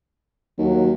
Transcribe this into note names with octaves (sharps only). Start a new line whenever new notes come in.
D#2 F#3